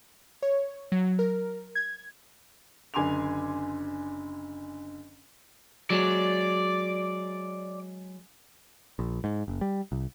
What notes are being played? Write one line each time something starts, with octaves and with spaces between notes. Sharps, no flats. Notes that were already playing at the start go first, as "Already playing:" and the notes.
C#5
F#3
A#4
G#6
F#1 D3 G#5 C6 D6 F7
F#3 G#3 D5
A#1
G#2
F#1
G3
C2